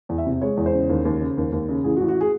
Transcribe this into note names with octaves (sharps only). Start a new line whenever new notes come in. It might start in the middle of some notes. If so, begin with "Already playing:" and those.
E2
E5
C3
G#3 C#5
E2
C5
C#3
D#2
D#2
C#3
D#2
D#2
C#3
A1 G#4
F#4
A1
F#4
G#4